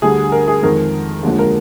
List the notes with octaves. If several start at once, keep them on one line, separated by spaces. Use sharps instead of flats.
D2 D3 G3 G#4
A#4
G#4
F2 D#3 G#3 A#4
D#2 D3 F3 G#3
A#4